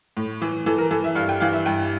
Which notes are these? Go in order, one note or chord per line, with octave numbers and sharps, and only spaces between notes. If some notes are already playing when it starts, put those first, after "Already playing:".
A2
E3
E3 A4
A#4
E3 A4
E5
G2 F5
G5
E3 F5
E5
G2 G5